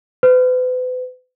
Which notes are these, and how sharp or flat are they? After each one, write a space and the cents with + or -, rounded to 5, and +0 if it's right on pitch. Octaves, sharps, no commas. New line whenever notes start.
B4 +40